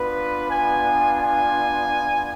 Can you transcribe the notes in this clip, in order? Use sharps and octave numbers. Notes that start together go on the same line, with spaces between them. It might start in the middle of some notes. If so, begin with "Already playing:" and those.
Already playing: B3 D4 F4 B4
G#5
G#5